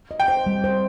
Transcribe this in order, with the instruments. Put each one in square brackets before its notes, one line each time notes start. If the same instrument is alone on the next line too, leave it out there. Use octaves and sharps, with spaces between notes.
[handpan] D#5
[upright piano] G5
[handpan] C5
G3
C5